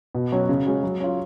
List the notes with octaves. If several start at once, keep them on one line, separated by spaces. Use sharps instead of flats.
B2
F#3 C#4 F#4
C#3
G#3 C#4 F#4
F#3
C#4 F4